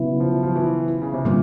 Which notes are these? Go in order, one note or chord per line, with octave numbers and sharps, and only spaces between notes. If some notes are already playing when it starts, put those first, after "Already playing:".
Already playing: C#3 F#3 B3 E4
F3
F3
E3
C#3
C3
A#2 D3 G3 A#3